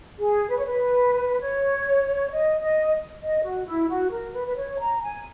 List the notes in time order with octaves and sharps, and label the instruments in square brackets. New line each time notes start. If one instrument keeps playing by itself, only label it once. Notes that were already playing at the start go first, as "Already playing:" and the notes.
[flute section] G#4
B4
C#5
B4
C#5
D#5
D#5
D#5
F#4
E4
F#4
A#4
B4
B4
C#5
A#5
G#5